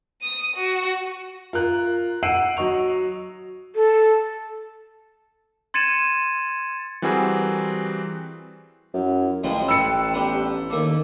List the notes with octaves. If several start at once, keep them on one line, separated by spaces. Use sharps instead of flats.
D#6 D#7
F#4
F4 A#4 F#6
F#5 E6 C7 D7 D#7 F#7
F#3 D#5 C#6 F7
A4
C6 G#6 A6 C#7 D#7 E7
E3 G3 C4 F#4 G#4 A#4
F#2 E4
A1 A2 F3 G#3 G5
A1 B4 F5 A5 E6 C#7
B3 D4 G4
D#2 A#3 A4 D6